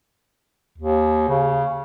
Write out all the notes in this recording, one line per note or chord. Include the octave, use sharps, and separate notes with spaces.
D#2
C#3